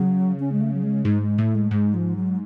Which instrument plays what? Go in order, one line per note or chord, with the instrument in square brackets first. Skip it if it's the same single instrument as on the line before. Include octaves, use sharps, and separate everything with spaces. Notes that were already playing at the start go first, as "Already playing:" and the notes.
Already playing: [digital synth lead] C#3 [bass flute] F#3
[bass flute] C#4
G#3
A3
F#3
G#3
[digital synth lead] G#2 [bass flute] G#3
[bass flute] G#3
[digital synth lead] A2 [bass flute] A3
[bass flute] G#3
[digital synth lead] G#2 [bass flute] G#3
[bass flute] F3
F#3